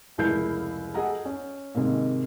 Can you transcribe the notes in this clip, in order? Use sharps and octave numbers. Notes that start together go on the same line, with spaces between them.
F1 C#2 E4 A#4 G6 C7
G#4 A4 D#5 F#5 G#5 A#5
C#4
G#2 C3 D#3 A#3